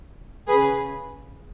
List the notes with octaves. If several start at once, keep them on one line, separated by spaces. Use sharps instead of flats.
C#3 G#4 B4